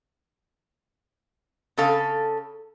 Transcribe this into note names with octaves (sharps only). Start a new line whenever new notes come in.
C#3 C4 A4 F5